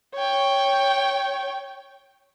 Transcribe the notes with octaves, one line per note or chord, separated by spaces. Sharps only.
C#5 G5